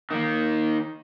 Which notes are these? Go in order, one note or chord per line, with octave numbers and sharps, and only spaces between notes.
D#3 A#3